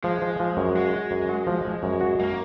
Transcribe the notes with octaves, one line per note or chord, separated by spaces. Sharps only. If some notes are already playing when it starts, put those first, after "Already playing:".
F3 G#3
F3
F3
F#2
G#3 F#4
F#4
F#2
F#4
F3
F3
F#2
F#4
F#2 A#3